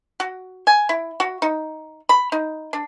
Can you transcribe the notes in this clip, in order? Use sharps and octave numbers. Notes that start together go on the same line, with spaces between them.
F#4
G#5
E4
F#4
D#4
B5
D#4
D4